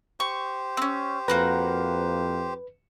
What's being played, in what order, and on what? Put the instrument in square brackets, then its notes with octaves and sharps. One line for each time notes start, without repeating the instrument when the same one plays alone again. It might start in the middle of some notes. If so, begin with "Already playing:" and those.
[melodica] G4 C5 [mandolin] C#6
[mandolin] C4 C#4
[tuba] F2 [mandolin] A#3 F#4 A#5 [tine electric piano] B4